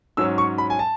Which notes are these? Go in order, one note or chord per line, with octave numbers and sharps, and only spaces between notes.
G#2 F#3 C#4 E6
C#6
B5
G#5
A5